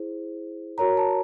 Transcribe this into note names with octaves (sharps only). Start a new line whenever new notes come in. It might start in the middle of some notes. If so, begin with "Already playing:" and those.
Already playing: E4 G#4 C5
F#4 A#4 C#5 A#5
A5